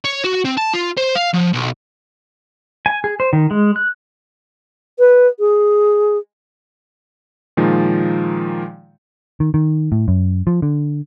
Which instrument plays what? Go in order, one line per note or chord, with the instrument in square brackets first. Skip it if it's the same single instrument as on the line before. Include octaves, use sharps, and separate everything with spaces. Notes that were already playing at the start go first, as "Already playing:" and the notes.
[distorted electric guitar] C#5
F#4
C4
A5
F4
C5
F5
F3
B1
[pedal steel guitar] G#5
G#4
C5
D#3
G#3
F#6
[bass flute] B4
G#4
[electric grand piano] A#2 D#3 F3 G#3
[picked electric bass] D#3
D#3
A2
F#2
F3
D3